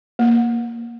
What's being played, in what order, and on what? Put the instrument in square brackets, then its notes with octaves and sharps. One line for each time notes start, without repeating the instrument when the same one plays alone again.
[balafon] A#3